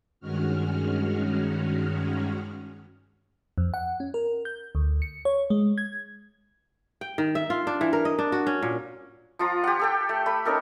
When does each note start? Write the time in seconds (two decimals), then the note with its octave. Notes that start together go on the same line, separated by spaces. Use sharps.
0.20 G2 D#3 G#3 C#4 F#4 F6
3.58 F2
3.74 F#5
4.00 C#4
4.14 A#4
4.45 G6
4.75 D2
5.02 C#7
5.25 C#5
5.50 G#3
5.78 G#6
7.01 G5
7.18 D#3
7.35 E5
7.50 F4
7.67 D4
7.81 E3
7.93 A#4
8.05 D#5
8.19 D4
8.32 F#4
8.47 C#4
8.62 A#2
9.39 F3 F4 A#5
9.64 G4 F#5
9.79 G4 A4 G5
10.09 A3
10.26 A3 B5
10.45 C#4 D#4 A4 A#4